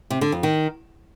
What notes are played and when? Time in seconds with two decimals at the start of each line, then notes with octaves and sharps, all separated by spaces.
0.10 C3
0.21 D3
0.32 F2
0.43 D#3